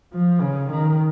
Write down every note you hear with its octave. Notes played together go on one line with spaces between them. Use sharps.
F3
C#3
D#3